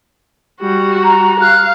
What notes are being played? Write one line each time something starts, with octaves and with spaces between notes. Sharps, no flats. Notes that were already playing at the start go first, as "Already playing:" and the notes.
G3 F#4
A#5
F5 F#6